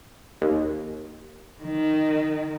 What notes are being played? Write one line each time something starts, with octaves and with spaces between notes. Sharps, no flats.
D#2
D#3